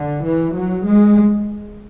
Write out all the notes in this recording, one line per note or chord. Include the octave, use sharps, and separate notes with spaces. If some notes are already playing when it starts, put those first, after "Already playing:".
Already playing: D3
E3
F#3
G#3